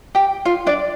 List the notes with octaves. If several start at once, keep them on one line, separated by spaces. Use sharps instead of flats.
G4 G5
F4 F5
D4 D5